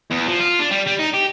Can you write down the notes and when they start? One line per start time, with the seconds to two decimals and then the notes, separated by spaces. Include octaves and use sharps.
0.11 E2
0.28 F3
0.40 F4
0.59 D4
0.71 G3
0.87 G3
1.00 D#4
1.14 G4